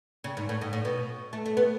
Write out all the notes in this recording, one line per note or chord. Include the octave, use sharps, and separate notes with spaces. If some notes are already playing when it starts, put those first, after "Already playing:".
C#3
G#2
A2
G#2
A2
B2
A3
A3
B3